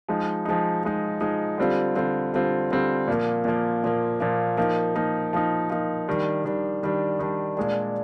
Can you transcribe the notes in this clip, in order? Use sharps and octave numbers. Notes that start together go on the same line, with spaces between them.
F3 G#3 D#4
F3 G#3 D#4
F3 G#3 D#4
F3 G#3 D#4
D3 G3 C4 F4
D3 G3 C4 F4
D3 G3 C4 F4
D3 G3 C4 F4
A#2 F3 A#3
A#2 F3 A#3
A#2 F3 A#3
A#2 F3 A#3
F3 A#3 D#4
F3 A#3 D#4
F3 A#3 D#4
F3 A#3 D#4
D#3 G3 D4
D#3 G3 D4
D#3 G3 D4
D#3 G3 D4
A#2 G#3 D4